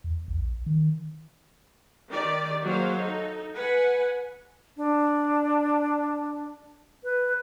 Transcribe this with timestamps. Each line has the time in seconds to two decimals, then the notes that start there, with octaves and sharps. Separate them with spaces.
0.04 E2
0.28 A#1
0.66 D#3
2.08 D#3 G4 D5
2.63 F#3 A#3 G#4 C5 F5
2.97 D#4 A4
3.55 B4 F#5 G#5
4.77 D4
7.04 B4